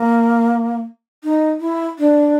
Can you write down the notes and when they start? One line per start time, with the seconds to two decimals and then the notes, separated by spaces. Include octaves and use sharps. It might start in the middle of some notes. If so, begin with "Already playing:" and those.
Already playing: A#3
1.24 D#4
1.60 E4
1.99 D4